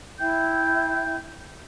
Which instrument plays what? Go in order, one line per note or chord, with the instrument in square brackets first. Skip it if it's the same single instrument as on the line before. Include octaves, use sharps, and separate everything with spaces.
[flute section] E4 E5 G5 G6